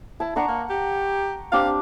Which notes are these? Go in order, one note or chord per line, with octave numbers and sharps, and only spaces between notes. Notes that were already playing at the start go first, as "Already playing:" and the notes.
E4 A5
D4 F#5 A#5 C#6
A#3
G4
C4 D4 G4 F5